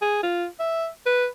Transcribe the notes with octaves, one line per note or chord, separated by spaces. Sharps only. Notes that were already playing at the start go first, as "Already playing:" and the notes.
G#4
F4
E5
B4